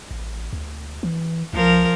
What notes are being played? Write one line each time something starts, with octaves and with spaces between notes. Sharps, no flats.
A1
D2
E3
C#2 F3 A#4